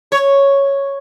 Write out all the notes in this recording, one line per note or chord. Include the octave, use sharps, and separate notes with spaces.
C#5